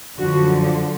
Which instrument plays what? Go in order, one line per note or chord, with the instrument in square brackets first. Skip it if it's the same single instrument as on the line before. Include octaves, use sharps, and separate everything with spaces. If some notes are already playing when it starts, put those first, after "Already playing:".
[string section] F#2 D3 F3 [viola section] F#4